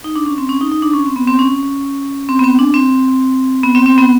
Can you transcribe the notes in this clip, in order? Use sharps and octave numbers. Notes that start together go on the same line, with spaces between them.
D#4
D4
C#4
C4
C#4
D#4
D#4
D4
C#4
C4
B3
C4
C#4
C4
B3
C4
D4
C4
B3
C4
C4
B3